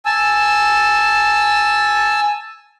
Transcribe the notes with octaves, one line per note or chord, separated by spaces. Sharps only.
G#5 A5 E6